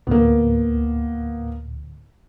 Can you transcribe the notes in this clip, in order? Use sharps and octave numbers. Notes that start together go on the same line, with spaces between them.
D2 A2 A#3 B3